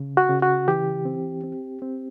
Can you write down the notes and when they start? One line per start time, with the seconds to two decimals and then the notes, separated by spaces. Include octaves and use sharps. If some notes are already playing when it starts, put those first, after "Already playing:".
Already playing: C#3
0.17 F#4
0.29 C#3
0.43 F#4
0.68 E3 G4
1.05 C4
1.44 C4
1.82 C4